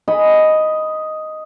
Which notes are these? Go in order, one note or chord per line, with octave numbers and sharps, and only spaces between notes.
D#5 G#5 B5